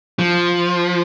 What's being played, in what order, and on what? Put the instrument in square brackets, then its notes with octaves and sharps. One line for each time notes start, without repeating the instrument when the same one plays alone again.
[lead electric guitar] F3